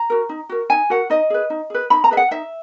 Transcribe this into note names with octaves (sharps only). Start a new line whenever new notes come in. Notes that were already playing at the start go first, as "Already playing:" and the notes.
Already playing: A#5
F#4 A#4
D#4
F#4 A#4
D#4 G#5
F#4 A#4 F#5
D#4 D#5
G#4 B4
D#4
G#4 B4
D#4 B5
A#5
G#4 B4 E5
F#5
D#4 E5